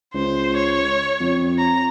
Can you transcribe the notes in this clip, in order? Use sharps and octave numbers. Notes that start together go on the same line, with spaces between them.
C#2 C5
C#5
F2
A#5